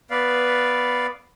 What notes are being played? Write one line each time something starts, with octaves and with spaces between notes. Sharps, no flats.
B3 B4 D5 F5